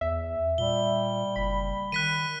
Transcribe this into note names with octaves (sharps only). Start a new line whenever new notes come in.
E2 E5
A#2 G3 G7
F#1 B5
D#3 F#6 B6 D#7